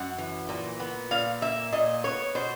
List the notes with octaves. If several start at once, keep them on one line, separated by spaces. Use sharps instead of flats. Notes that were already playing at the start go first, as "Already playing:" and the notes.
Already playing: F#2 F#5
E3
A#2
B3
A#2 F5
A#3 E5
A#2 D#5
B3 C#5
B2 C5